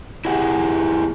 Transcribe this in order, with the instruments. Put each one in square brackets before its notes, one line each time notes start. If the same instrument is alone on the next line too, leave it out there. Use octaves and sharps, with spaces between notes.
[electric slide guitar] E4 G4 G#4 F#5